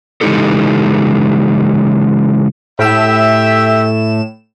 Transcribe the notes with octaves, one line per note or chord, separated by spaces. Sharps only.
C#3 E3 G#3 D#4 G4 A4
A2 G4 E5 E7